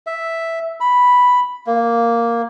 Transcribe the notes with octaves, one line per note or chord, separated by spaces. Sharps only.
E5
B5
A#3